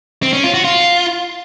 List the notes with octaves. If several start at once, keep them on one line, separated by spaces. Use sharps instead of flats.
C4
C#4
F4
F#4
F4